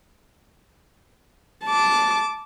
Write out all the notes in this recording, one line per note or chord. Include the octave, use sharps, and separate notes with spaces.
A5 D6